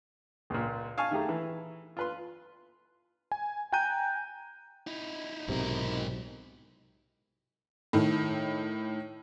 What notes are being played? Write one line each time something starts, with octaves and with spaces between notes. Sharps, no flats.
C#2 A#2
F5 G#5 A5 C#6
D#3 A3 G4 G#4 A#5
E3
F4 B4 C6
G#5
G5 G#5 A#5 F#6 G6 D#7
D#4 E4
B1 G#2 C3 A#4
A2 D#3